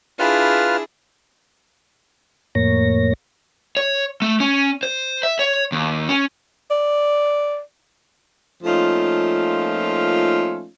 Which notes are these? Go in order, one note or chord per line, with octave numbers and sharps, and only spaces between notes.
D4 E4 F4 G#4 B4 F6
F2 A2 A#3 C#5 A#6
C#5
A3
C#4
C5
E5
C#5
D#2
C#4
D5
F3 A3 A#3 C#4 D#4 F4